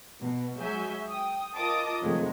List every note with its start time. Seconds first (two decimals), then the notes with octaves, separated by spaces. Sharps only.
0.20 B2
0.57 F#3 G#3 F#4 E5 G#5 G6
1.08 G5 D#6
1.56 F4 A#4 D#5 A5 D6 D#6
2.02 F2 C3 D#3 F#3 G#3 A3